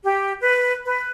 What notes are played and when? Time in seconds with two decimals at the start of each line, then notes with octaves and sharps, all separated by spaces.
0.04 G4
0.40 B4
0.85 B4